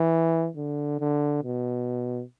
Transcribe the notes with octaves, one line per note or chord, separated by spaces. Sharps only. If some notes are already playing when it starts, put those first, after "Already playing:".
Already playing: E3
D3
D3
B2